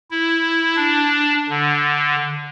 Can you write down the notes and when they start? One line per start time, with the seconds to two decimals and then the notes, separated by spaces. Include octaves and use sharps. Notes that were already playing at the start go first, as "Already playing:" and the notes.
0.11 E4
0.76 D4
1.49 D3